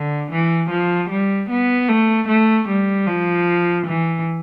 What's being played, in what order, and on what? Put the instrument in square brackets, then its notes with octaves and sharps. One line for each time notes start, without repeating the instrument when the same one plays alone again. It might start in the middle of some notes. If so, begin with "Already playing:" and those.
Already playing: [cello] D3
E3
F3
G3
B3
A3
A3
G3
F3
E3